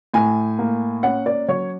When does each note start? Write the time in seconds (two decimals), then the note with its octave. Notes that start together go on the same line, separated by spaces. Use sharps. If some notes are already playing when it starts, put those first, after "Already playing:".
0.14 A2 G#5
0.59 A#3
1.03 C#4 F#5
1.26 D5
1.48 F#3 C#5